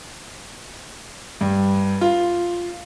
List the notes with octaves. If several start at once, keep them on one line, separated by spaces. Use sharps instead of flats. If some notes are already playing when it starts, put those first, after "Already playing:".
G2
F4